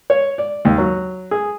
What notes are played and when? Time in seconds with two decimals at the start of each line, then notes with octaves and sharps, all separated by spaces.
0.10 C#5
0.38 D5
0.65 D#2
0.78 F#3
1.31 G#4